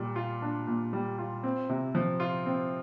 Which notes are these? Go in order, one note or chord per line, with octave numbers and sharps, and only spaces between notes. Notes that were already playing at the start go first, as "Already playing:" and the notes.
Already playing: A#2 G3
F4
D4
A#2
G3
F4
C4
C3
F3
F4
C4